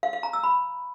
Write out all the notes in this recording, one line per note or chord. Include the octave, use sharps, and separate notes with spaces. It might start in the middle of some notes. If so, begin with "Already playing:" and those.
F5
F5
A#5
E6
B5